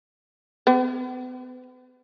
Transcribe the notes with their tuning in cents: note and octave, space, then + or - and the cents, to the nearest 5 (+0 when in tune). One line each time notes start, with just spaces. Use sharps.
B3 +40